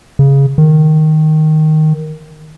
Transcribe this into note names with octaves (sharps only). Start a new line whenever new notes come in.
C#3
D#3